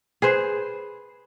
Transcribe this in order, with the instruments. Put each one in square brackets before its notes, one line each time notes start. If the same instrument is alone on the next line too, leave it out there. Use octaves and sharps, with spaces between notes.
[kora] G#4 B4 C5